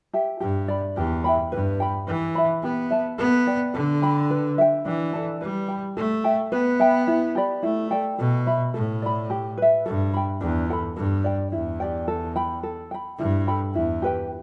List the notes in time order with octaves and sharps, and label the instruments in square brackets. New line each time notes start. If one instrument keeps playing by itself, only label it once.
[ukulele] G4 E5 G5
[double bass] G2 [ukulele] G4
[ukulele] D5 B5
[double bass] E2 [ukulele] G4
[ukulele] E5 G5 B5
[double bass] G2 [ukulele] B4
[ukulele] G5 B5
[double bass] E3 [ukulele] B4
[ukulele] E5 B5
[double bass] B3 [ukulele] G4
[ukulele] E5 A5
[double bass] B3 [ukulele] A4
[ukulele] D5 G5
[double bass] D3 [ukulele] A4
[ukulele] G5 B5
B4
E5 G5
[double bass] E3 [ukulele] D4
[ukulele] A4 D5 A5
[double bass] G3 [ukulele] B4
[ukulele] G5 B5
[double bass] A3 [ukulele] A4
[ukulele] E5 G5
[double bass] B3 [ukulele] B4
[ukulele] E5 G5 B5
E4
G4 D5 B5
[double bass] A3 [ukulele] E4
[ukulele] A4 D5 G5
[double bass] B2 [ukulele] A4
[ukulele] E5 B5
[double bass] A2 [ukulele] A4
[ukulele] D5 B5
G4
B4 E5
[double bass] G2 [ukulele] A4
[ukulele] G5 B5
[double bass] E2 [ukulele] D4
[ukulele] A4 G5
B5
[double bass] G2 [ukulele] A4
[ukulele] D5 G5
[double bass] E2 [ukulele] E4
[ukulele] G4 D5 G5
A4
G5 B5
A4
G5 B5
[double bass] G2 [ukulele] E4
[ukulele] A4 G5 B5
[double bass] E2 [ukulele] E4
[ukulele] G4 B4 G5